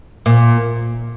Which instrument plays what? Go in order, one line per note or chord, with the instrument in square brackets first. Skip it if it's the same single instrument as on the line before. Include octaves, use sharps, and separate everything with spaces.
[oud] A#2